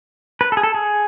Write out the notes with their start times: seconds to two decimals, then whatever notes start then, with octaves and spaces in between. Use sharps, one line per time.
0.41 B4
0.52 A4
0.57 G#4
0.63 A4
0.74 G#4